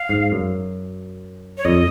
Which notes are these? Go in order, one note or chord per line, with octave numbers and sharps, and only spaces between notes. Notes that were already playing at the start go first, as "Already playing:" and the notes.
Already playing: F5
G#2
F#2
C#5
F2 D#5